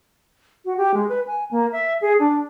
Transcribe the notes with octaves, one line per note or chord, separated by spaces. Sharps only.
F#4
G4
G#3
B4
G#5
A#3
E5
G#4
D4